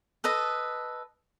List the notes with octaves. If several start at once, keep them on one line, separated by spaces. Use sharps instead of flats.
A4 B4 D#5